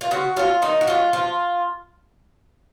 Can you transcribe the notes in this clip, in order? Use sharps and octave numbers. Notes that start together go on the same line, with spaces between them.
F4
C#3 F#4
F#3 C#4 F4
D#3 D#4
F#4
G#3 C#4 F4
F3 F4